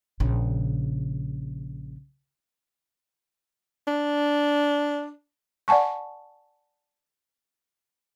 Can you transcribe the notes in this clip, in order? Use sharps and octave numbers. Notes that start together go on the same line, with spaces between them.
A#1 C#3
D4
D5 F#5 G#5 A5 C#6